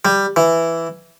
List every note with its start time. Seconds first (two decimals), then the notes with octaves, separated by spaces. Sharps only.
0.05 G3
0.36 E3